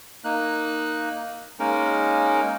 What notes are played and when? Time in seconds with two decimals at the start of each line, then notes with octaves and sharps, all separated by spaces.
0.24 A#3 D#4 F#6
1.59 G#3 A#3 C#4 D#4 A#4